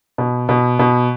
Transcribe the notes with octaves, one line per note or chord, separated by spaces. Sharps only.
B2
B2
B2